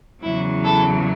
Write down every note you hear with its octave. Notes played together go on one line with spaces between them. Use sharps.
E2 C#3 F#3 E4
E4 A4